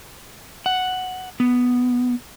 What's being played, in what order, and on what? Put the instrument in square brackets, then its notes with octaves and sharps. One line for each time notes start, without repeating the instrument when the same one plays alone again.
[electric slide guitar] F#5
B3